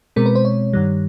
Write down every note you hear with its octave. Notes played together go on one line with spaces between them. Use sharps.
B2 G#3 C4 A#4
B4
C5
C#5
G2 D#3 G3